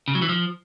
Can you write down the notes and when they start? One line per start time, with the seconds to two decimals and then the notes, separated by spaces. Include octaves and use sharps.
0.08 C#3
0.15 F#3
0.22 E3
0.29 F3